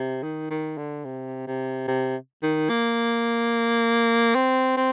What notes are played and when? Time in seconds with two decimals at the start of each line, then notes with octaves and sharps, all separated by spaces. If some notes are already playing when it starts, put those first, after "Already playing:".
Already playing: C3
0.23 D#3
0.50 D#3
0.77 D3
1.04 C3
1.47 C3
1.88 C3
2.43 D#3
2.69 A#3
4.35 C4
4.77 C4